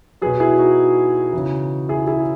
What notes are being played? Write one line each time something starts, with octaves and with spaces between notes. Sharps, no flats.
B2 F#3 G#4 B4
E4 G#4
D#4 F#4
C#3 E3
E4 G#4
E4 G#4